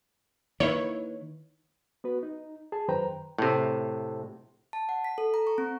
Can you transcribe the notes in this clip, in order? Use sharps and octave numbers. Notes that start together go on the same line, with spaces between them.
D#3 A#3 E4 B4 C#5
B3 F#4 B4
D#4
G#4 A5
F#2 D#3 B4 C5 G5 A#5
A2 C3
A5
F#5
B6
A4
A#5
C#6
C4